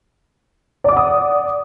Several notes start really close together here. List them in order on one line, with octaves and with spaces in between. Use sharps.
D5 D6 F#5 D#6